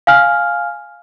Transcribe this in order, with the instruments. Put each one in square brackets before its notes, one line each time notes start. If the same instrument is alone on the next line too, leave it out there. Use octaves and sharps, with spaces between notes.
[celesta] F5 G#5 F6